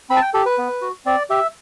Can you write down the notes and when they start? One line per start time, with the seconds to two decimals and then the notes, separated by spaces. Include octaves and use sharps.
0.10 C4 B5
0.16 A5
0.22 G5
0.34 G4 A4
0.46 B4
0.58 B3
0.82 F#4
1.06 C4 D5
1.30 G4 E5